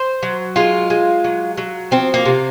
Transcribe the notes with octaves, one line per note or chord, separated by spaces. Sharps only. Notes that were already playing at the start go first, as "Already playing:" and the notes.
Already playing: C5
F#3
G#3 F4
G#3
F#3
F#3
F3 C4
A#3
C3